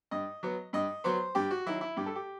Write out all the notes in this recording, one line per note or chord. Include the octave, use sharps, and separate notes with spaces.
G2 D#5
F#3 B3
G2 D#5
F#3 B3 C5
G2 G4
F#4
D#3 F#3 E4
E4
G2 G4
A4
G4